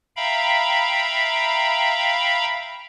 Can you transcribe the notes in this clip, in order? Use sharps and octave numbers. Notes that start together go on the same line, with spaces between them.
E5 F5 G5 A#5 B5